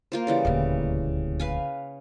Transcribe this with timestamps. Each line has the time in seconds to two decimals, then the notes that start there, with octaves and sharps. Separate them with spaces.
0.12 A#3 F4 C5
0.27 C#3 E3 G3
0.45 D#1 D2
1.40 B4 F5 G#5